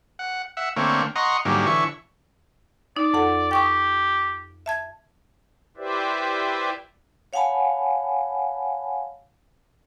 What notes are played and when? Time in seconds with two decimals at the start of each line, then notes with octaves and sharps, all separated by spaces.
0.19 F#5
0.57 E5 F#5
0.76 D3 A3 A#3 C4 C#5
1.16 D#5 F#5 A#5 C6 C#6
1.45 G#2 D3 F#3 G3 A#3
1.66 D3 E3 C#5 E5 C#6
2.96 D#4 D5
3.14 F2 A4 F#5
3.51 G4 G5 C#6 D#6
4.66 E5 A5 G#6
5.77 E4 G4 B4 C5 D5 E5
7.33 C#5 F5 F#5 G#5 A5 B5